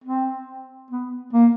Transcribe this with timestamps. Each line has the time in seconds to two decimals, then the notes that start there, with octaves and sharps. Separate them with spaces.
0.04 C4
0.91 B3
1.33 A#3